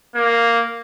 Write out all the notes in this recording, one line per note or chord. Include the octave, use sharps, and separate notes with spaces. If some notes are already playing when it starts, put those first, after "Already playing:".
A#3